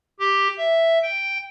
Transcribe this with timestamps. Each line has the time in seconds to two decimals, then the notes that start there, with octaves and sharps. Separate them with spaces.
0.20 G4
0.58 E5
1.02 G5